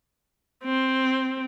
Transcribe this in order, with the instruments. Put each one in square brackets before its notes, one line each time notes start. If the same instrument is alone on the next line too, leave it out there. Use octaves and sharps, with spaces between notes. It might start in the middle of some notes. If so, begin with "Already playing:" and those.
[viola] C4